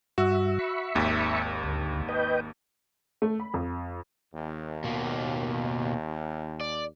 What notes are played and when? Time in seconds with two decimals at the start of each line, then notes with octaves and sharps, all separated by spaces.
0.18 G2 F#4 E5
0.59 E5 B5 C#6
0.95 G#1 D#2
1.64 D2
2.09 B4 D#5 G5
3.22 A3
3.40 B5
3.54 F2
4.34 D#2
4.84 B2 A#3
6.60 D5